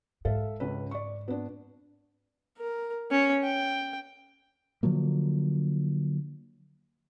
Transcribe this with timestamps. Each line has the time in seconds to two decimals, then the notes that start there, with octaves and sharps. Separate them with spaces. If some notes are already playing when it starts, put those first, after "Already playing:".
0.25 G#2 A4 E5 F5
0.60 C#2 C#4 B4
0.91 D5 C#6
1.28 B3 D4
2.58 A#4
3.11 C#4 C#5
3.44 G5
4.83 D3 F3 F#3 A#3